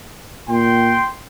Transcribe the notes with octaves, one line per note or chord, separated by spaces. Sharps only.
A#2 G5 C6